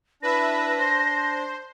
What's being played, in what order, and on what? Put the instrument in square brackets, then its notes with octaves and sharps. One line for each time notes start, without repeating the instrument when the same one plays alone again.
[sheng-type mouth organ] D4 [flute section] E4 B5 [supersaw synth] B4 E5 [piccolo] A#6
[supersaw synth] C5 [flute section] C6